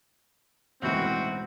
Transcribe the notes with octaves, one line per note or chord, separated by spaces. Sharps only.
E1 C2 F#2 A2 E3 C4 D#4 F#4